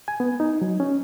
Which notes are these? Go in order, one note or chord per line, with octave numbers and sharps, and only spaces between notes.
G#5
B3
D#4
F#3
C#4